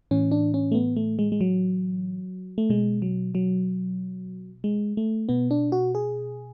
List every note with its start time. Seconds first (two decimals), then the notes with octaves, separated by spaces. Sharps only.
0.11 A2 E3 C#4
0.31 D4
0.54 C#4
0.72 A3
0.75 B3
0.96 A3
1.19 G#3
1.32 G#3
1.41 F#3
2.58 A3
2.70 B2 G#3
3.02 F#3
3.35 F#3
4.64 G#3
4.97 A3
5.29 B2 B3
5.51 D4
5.72 F#4
5.95 G#4